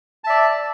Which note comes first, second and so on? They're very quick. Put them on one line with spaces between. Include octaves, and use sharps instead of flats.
A5 E5 D5